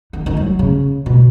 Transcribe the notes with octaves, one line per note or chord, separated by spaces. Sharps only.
D#3
D#3
F#3
C#3
B2